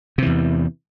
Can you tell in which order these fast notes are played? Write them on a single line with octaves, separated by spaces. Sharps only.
C3 E3 E2